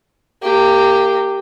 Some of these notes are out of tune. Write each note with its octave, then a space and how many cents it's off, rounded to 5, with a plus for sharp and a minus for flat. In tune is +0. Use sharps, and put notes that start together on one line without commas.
A#3 -20 G4 +0